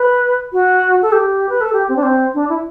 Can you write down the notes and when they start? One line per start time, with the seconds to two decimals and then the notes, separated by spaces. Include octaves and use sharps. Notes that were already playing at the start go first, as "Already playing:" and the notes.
Already playing: B4
0.53 F#4
1.02 A4
1.12 G4
1.49 B4
1.61 A4
1.73 G4
1.89 C4
1.96 D4
2.03 C4
2.34 D4
2.49 E4